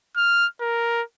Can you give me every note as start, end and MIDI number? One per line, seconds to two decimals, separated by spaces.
0.16 0.46 89
0.61 1.02 70